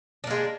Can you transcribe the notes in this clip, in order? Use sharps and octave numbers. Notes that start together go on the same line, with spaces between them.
G#3 A#3 D4